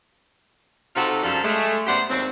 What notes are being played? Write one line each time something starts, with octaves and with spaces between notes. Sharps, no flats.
C3 D#4 F4 F#4 A4
F#2 F3 G3 F4 A4
G#3 A3
F#2 B3 G4 C5 D5 F#5
D#2 G#2 F#3 C4